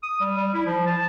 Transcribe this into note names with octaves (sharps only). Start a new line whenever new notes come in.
D#6
G3
G3
E4
F3
A5